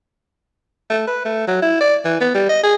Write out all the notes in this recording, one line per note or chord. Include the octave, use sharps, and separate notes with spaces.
A3
B4
A3
F#3
E4
D5
E3
B3
G3
D#5
G#4